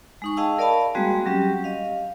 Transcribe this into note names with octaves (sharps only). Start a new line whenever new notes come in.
G#3 D#4 C#6
G#4 D#5 F5 G5 A5 E6
A#4 D5 D#5 F5 A5 B5
G3 G#3 A#3 C4 F#4 G#4
F#3 G3 C#4 G4
D#5 F5